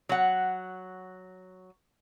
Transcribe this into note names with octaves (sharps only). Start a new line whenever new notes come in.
F#3 F#5